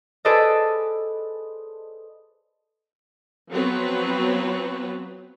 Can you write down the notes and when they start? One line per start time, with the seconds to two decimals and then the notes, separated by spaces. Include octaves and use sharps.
0.25 G#4 A4 B4 C5 D5 D#5
3.50 F3 F#3 B3 C4 B4 C#5